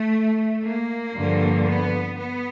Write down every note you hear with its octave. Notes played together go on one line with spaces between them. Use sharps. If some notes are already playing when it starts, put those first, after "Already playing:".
Already playing: A3
A#3
G2 D3 F3
B3
B3